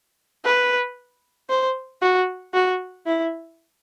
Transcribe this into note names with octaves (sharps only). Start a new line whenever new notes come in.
B4
C5
F#4
F#4
E4